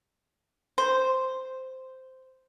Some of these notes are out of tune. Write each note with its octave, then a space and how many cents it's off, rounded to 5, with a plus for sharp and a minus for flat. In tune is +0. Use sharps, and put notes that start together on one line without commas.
C5 -5